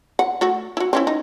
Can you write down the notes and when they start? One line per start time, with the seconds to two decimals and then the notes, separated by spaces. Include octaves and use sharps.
0.19 F#5
0.41 A3 F#4
0.77 E4 F#4
0.93 C4 C#4 E4
1.07 D#4